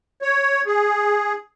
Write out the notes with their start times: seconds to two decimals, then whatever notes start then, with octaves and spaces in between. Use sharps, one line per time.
0.22 C#5
0.66 G#4